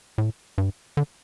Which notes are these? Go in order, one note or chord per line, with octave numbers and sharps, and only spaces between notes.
A2
G2
D3